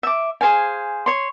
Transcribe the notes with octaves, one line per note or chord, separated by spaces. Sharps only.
E5 D6
G#4 C5 F5 G#5
C#5 C6